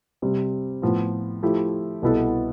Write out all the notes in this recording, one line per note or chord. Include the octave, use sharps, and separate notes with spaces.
C3 G3 C4
A2 F3 B3 F4
F3 A3 E4 G4
C2 B2 B3 E4 A4